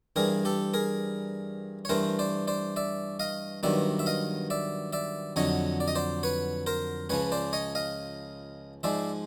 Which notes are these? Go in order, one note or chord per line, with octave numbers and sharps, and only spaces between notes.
G2 E3 G3 G#4 A#4
G4 A4
G#4 A#4
C#5
G2 E3 A3 A#4 C5
C5 D5
C5 D5
D5 E5
D#5 F5
G2 D#3 F#3 B3 D5 E5
E5
D#5 F5
D5 E5
D5 E5
F2 D3 F#3 C#5 D#5
D5
D#5
C5 D5
B4 C#5
A#4 C5
C#2 C#3 F3 B4 C#5
C5 D5
C#5 D#5
D#5 F5
G#2 F3 G#3 D5 E5